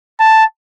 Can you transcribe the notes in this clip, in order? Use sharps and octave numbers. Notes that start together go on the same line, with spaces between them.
A5